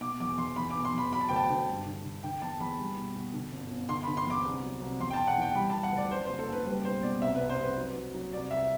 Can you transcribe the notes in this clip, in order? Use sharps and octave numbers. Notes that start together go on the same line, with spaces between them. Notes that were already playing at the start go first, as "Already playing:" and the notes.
B2 D6
E2 D6
E2 C6
E2 B5
D6
B2
C6
E2 B5
F#3 B5
A5
D2 G5
A5
D3
G2
D3
D3
D3 G5
E2 A5
E2 B5
G3
B2
B2
D3
G1
G1
D3 C6
B5
D3
C6
E2 D6
C2
F#3
C2
E2 C6
G5
A5
E1
F#5
E3 G5
G3 B5
A5
G3
F#5
D2 D5
F#2 C5
C5
F#1
A4
F#1 B4
G3 B4
B1 C5
B2 D5
C2 E5
B4
C2
C5
C2 B4
F#3
F#3
F#3
C2 D5
C2 E5